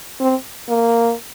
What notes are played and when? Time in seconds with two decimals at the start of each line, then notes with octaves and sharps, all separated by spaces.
0.20 C4
0.69 A#3